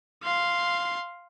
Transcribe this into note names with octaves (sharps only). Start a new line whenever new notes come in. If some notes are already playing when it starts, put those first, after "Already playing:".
F5 C6